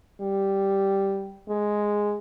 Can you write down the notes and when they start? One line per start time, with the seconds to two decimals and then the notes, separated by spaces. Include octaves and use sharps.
0.21 G3
1.49 G#3